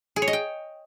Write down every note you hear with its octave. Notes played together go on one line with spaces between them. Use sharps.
G#4
C#5
D#5
G5